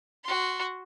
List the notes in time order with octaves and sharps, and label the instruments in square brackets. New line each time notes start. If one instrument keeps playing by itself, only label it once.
[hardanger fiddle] F#4 C6